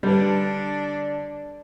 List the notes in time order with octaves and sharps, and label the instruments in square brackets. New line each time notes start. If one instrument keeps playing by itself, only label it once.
[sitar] D3 [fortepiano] G3 B4 [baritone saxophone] D4